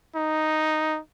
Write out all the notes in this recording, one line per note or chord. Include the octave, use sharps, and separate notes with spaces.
D#4